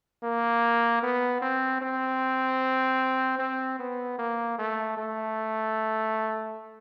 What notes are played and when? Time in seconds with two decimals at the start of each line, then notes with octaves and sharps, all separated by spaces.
0.23 A#3
1.03 B3
1.42 C4
1.82 C4
3.39 C4
3.79 B3
4.18 A#3
4.58 A3
4.97 A3